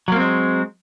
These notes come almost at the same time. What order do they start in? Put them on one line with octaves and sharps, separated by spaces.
F#3 A#3 C4 G#3